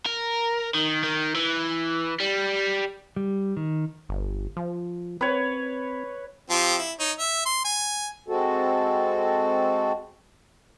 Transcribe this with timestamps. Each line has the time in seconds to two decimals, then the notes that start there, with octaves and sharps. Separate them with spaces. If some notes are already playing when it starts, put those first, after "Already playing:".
0.06 A#4
0.74 D#3
1.04 D#3
1.35 E3
2.20 G3
3.16 G3
3.57 D#3
4.09 G1
4.57 F3
5.21 C4 B4 C#5
6.50 F3 C4 G4
6.78 E4
7.00 D#4 C#5
7.19 E5
7.45 C6
7.65 G#5
8.28 G#3 C4 F#4 A4